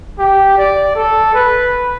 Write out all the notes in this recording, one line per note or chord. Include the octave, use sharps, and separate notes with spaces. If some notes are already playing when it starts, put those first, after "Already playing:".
G4
D5
A4
B4